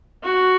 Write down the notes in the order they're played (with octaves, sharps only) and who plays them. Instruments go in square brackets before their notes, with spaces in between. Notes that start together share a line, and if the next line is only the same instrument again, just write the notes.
[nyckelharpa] F#4